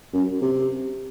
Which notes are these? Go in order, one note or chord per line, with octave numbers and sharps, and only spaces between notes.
F#2
C3